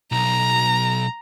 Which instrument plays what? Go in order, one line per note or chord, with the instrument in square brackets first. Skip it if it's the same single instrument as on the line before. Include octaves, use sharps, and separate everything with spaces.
[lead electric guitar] B1 [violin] A#5